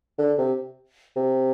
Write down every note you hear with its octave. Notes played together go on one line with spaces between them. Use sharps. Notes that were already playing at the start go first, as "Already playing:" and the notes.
D3
C3
C3